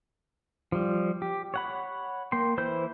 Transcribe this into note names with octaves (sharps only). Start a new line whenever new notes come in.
F3 G3
G4
C#5 F#5 B5
A#3 G5 C6
E3 C5 B5 G6